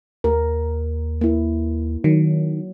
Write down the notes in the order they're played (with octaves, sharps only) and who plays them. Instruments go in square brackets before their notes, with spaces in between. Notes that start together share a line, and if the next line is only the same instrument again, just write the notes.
[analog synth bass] D#2 [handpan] A#4
[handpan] A#3 E4
[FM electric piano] D#3 [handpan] F#3